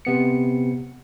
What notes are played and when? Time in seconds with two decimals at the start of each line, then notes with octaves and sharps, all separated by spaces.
0.05 C3 B3 C#7